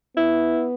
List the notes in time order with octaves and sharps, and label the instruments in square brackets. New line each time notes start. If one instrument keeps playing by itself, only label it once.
[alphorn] B3 [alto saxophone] E4